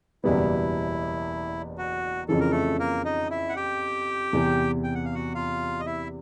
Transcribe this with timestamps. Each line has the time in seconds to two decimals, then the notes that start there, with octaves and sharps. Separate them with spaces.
0.24 F#1 E2 B2 G3 B3 E4
1.78 F#4
2.28 F2 C#3 E3 A4
2.40 A#4
2.51 A3 A4
2.79 A#3 A#4
3.05 D#4 D#5
3.30 E4 E5
3.49 F#5
3.56 G4 G5
4.33 E2 C3 E3
4.84 G5
4.95 F#5
5.05 F5
5.15 F#4 F#5
5.35 F4 F5
5.80 D#5
5.86 E4 E5